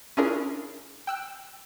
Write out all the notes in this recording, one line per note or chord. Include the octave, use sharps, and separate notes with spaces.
C#4 D4 E4 F4 G#4 A#4
G5 E6 F#6